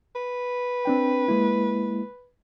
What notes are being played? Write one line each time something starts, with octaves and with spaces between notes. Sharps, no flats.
B4
C4 D4 G5
G#3 A#3 E4